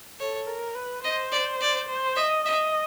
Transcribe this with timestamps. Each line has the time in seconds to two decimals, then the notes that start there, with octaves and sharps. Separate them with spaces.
0.19 A4 C#5
0.47 A#4
0.75 B4
1.03 C5 D#5
1.32 D5
1.61 D5
1.89 C5
2.16 D#5 E5
2.45 D#5 E5